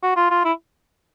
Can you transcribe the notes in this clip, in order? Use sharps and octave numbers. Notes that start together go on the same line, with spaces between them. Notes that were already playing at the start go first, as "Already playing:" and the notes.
F#4
F4
F4
E4